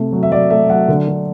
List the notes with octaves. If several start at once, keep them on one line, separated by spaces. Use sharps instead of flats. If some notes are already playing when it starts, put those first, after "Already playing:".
Already playing: C3 A3
F#3
E5
F#3 D5
A3 E5
F#3 F#5
D3
D3